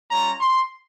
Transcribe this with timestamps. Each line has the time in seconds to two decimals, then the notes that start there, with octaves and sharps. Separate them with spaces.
0.11 G3 C#4 F4 A#5
0.40 C6